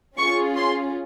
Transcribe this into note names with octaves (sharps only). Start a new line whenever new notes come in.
C#4 F4 G#4 C#6
C6